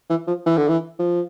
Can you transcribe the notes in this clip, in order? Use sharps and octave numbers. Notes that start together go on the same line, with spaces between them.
E3
F3
E3
D3
E3
F3